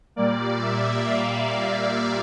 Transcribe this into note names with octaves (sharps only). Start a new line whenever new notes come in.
A#2 G3 A#3 D5
E5
F5